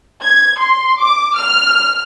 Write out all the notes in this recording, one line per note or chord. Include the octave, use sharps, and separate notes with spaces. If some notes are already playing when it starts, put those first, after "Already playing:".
G#6
C6
D6
F6